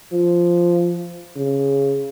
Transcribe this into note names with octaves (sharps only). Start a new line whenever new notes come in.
F3
C#3